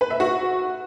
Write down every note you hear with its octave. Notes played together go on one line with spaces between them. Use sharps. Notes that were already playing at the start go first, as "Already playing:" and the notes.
B4
E5
F#4